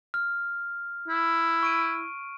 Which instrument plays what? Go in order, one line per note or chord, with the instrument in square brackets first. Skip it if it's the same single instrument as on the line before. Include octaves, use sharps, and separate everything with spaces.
[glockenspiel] F6
[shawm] E4
[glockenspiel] C#6 D7 D#7